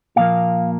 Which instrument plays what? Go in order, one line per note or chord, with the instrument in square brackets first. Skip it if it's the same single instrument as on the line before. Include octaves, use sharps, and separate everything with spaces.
[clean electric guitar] A#2 F3 A#3 F5